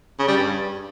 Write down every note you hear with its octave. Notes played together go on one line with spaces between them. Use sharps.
C#3
G3
G2